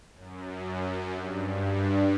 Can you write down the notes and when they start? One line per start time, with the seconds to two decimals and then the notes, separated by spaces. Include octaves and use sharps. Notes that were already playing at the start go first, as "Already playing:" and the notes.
0.14 F#2
1.12 G2